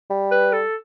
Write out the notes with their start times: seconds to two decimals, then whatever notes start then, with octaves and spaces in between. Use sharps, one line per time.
0.10 G3
0.32 B4
0.53 A4